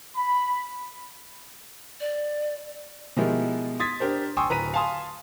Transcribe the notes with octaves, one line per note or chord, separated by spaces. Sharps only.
B5
D5
B2 F3 G#3 E4 G4 A#4
C6 D#6 G#6 A6 B6
D4 G4 A#4 C5
G5 G#5 C6 C#6 D#6 E6
D1 B4 A#5 B6 D#7
F5 G#5 A5 C6 D#6